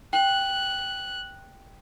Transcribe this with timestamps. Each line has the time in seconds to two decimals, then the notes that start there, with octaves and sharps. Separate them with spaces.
0.13 G5 F#6